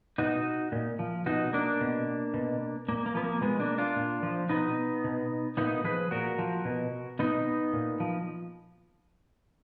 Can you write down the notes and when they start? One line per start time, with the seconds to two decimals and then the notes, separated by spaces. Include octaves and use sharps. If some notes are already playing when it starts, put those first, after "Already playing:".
0.18 B2 D#4 F#4
0.72 A#2
0.99 F3
1.26 B2 D#4 F#4
1.53 A#3 D4
1.81 B2
2.34 B2
2.88 A#2 A#3
3.06 A#3
3.15 F3 B3
3.24 A#3
3.41 B2 G#3 B3
3.59 A#3 D4
3.78 D4 F4
3.96 A#2
4.23 F3
4.49 B2 B3 D#4
5.04 B2
5.57 A#2 B3 D#4
5.84 F3 G#4 B4
6.11 A#2 F#4 A#4
6.39 F3
6.65 B2
7.19 B2 B3 D#4
7.73 A#2
8.00 F3